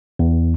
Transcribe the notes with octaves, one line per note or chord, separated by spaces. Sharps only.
E2